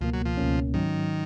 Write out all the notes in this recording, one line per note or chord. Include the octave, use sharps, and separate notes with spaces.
C#2 B2 F3 A#3
F#3
F3
C#2 B2 A#3 C#4
G#2 D#3 F#3 C#4